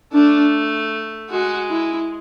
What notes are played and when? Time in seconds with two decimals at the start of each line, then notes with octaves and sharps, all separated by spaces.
0.13 A3 D4
1.29 G#3 F#4
1.69 E4